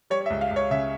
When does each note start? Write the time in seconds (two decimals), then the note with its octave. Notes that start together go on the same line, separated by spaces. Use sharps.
0.10 G3 C#5
0.21 C#5
0.26 C#2 E5
0.41 F5
0.51 C#2
0.56 C#5
0.71 C#3 E5